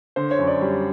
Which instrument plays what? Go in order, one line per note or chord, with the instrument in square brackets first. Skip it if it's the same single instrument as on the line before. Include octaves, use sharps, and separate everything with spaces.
[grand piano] D3 C5
C#5
F#2
D5
G3